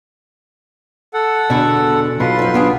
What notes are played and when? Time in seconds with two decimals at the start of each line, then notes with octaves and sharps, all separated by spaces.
1.14 A4 F#5
1.50 E2 B2 D3 G#5
2.20 B1 B2 F4 B4 C6
2.39 F#2 F3
2.54 B3 D4 G#4